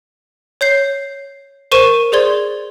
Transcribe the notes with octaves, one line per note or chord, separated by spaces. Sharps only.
C#5 G6 C7
A#4 C5 C#6 D#7 E7
G#4 C5 D5 C6 G#6